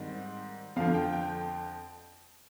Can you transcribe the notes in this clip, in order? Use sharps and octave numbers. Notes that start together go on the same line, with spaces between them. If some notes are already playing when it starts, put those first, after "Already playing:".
Already playing: G#2 D#3 G3 C4
F2 D3 F3 F5
G5
G5